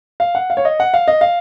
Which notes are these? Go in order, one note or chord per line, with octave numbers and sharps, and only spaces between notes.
F5
F#5
F5
C#5
D#5
F#5
F5
D#5
F5